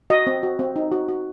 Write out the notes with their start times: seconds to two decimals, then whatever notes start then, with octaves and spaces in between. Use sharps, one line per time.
0.10 F#4 D#5
0.27 C4
0.43 F#4
0.59 C4
0.76 D#4
0.92 F#4
1.08 F#4